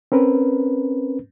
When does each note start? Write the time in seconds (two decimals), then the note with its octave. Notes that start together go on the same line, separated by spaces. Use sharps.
0.12 C4 C#4 A#4 B4